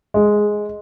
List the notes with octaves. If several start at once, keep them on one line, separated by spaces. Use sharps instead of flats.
G#3